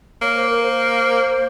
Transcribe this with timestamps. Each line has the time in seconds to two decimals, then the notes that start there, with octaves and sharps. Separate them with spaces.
0.22 A#3 C#5
0.36 C5
0.49 A#4
0.63 C5